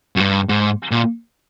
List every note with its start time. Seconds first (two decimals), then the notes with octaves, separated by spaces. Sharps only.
0.16 F#2
0.20 G2
0.49 G#2
0.91 A#2